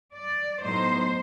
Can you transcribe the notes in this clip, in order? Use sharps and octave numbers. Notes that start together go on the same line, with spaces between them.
D5
A2 F#3 B3 D#4 C5